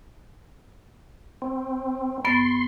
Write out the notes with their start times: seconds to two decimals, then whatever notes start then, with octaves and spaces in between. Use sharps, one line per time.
1.42 C4
2.25 G2 B3 C6 A6